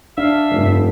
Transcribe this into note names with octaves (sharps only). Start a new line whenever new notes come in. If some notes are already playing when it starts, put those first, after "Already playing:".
D4 E5 F5
F1 G2 C#3 G3